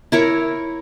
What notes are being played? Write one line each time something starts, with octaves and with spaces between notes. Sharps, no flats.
E4 A#4 C#5